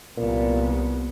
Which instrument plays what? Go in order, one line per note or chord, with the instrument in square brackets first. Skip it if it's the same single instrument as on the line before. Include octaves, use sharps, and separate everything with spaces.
[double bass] C2 B3 [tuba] A#2